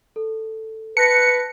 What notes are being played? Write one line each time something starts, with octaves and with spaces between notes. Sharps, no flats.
A4
B4 A5 F#6 A#6 C#7